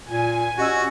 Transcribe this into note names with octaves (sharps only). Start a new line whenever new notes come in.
A#2 G#5
C#4 F#4 G4 D#5 E6